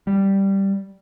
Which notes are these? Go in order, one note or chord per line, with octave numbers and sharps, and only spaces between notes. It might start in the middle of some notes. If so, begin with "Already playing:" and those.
G3